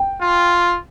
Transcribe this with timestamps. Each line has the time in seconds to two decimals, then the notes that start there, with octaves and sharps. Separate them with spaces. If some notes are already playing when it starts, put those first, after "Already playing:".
Already playing: G5
0.22 F4